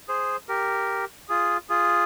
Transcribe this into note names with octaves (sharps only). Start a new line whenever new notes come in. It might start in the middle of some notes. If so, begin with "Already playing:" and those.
G#4 C5
G4 A#4
F4 G#4
F4 G#4